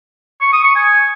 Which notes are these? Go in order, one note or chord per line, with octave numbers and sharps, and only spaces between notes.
C#6
D#6
C#6
G#5